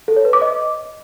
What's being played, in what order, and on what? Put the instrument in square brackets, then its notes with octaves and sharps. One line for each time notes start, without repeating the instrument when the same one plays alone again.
[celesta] A4
C#5
B4
D6
D#5